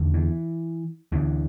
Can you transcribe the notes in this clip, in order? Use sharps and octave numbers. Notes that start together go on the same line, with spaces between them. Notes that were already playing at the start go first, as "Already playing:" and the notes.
Already playing: E2 D3
E3
D2 D3 E3